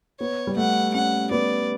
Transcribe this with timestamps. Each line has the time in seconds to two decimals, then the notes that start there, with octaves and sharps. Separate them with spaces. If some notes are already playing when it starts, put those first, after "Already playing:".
0.20 B3 C#5
0.47 G3
0.57 A3 F#5
0.95 C#4 F#5
1.31 B3 D5